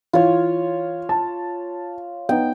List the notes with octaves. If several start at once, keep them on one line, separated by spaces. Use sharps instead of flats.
E3 F4 C#5 F5
A5
B3 D#4 G5